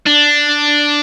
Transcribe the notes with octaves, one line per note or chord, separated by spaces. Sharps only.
D4